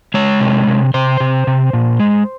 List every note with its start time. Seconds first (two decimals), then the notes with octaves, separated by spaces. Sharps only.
0.14 G#3 C#5
0.41 C3
0.67 C3
0.94 C3 C5
1.20 C3
1.47 C3
1.73 A#2
2.00 G#3